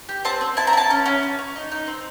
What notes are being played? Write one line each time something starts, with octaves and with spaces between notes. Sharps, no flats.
G4
C4 A5
C4
E4 A5
A#5
E4 A5
C#4
C#4
C#4
C#4
D#4
D#4
C4